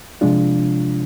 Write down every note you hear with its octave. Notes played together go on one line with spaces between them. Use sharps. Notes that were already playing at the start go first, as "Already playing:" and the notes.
C3 F3 G#3 D4 F4